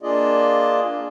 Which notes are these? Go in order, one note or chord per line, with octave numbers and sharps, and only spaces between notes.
A#3 D4 F4 G#4 D5 D#5